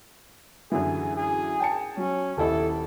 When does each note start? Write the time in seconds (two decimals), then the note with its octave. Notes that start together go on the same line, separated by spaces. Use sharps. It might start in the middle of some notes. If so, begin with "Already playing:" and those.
0.72 F#2 D3 E3 G#4
1.16 G#4
1.60 G5 A5 C#7
1.97 F#3 C#4
2.37 D#1 E4 A4